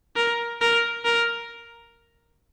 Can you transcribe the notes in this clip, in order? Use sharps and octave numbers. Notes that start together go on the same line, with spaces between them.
A#4
A#4
A#4